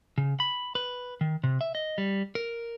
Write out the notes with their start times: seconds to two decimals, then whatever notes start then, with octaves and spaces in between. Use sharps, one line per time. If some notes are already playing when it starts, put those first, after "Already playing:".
0.18 C#3
0.40 B5
0.75 B4
1.21 D#3
1.44 C3
1.61 E5
1.75 D#5
1.98 G3
2.35 A#4